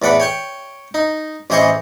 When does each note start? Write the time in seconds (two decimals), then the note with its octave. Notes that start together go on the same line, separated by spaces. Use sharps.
0.02 E2 A2 D5 F#5 B5
0.20 C#5 G5 C#6
0.94 D#4
1.50 A1 E3 G#4 C5 D#5 C#6